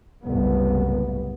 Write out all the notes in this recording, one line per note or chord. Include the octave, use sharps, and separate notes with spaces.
F#1 C2 A2 B3